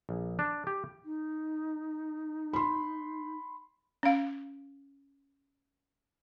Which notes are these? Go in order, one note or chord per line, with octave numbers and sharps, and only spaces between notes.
A#1
D4
G4
D#4
B5 C6
C#4 F5